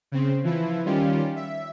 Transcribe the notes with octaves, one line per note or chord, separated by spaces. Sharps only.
C#3 C4
E3 F3 E4
D#3 G3 C#4 F4 G4
E5